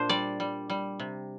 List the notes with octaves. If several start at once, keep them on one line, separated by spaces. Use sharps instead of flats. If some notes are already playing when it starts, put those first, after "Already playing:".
Already playing: A#2 D4 C5
G3 D5
G3
G3
C3